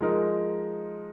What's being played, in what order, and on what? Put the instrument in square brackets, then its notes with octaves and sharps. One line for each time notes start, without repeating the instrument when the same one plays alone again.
[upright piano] F3 G#3 D#4 A#4